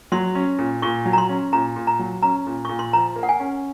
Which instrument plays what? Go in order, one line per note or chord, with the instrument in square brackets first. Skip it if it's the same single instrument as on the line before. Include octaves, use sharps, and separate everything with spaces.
[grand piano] F#3 [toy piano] C6
[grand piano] C#4
A#2
[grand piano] A#2 [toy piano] C#6
[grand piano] F#3
[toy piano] A#5
C6
[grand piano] C#4
[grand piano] A#2 [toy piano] A#5
[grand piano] A#2
[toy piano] A#5
[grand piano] F#3
[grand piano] C#4 [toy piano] A#5
[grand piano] A#2
[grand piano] A#2 [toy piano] C#6
[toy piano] C6
[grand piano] F3 [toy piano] A#5
[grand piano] A#3
[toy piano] F#5
G#5
[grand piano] C#4